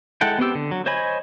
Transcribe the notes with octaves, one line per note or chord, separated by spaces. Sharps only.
G#3 E4 A4 F#5 G5
B3 C4 G4 E6
D3
F#3
C5 C#5 D#5 G#5 B5